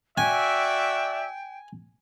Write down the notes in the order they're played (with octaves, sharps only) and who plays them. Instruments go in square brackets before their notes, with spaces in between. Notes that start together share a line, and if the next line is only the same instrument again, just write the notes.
[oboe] F#4 [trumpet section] D5 E5 [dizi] G5 [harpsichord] G#5